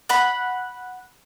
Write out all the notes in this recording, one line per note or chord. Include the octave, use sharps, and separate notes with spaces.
F#5 B5